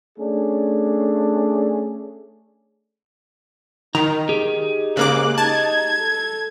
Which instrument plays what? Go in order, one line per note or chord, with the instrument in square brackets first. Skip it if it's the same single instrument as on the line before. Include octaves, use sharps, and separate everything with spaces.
[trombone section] A3 C#4 D4 G#4
[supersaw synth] D#3 [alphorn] D#4 [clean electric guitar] A#5
[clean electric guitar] G4 G#4
[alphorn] G#2 [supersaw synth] C#3 A#3 D6 [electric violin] F#6
[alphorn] D#4 [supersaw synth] A5 [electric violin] G#6
[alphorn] A4